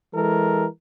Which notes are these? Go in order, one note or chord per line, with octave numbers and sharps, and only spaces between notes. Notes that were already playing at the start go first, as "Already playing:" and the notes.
E3 G#3 A4 A#4